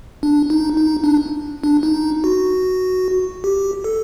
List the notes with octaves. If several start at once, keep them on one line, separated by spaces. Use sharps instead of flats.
D4
D#4
D#4
D4
D4
D#4
F#4
G4
A4